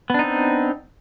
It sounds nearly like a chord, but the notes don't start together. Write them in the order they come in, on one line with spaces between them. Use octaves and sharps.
B3 D4 D#4 C4